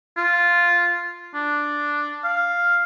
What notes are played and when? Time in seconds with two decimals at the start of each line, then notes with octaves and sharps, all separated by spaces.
0.17 F4
1.35 D4
2.24 F5